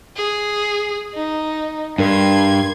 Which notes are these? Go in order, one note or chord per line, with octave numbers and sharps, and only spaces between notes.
G#4
D#4
G2 D4 A#4 C6 G#6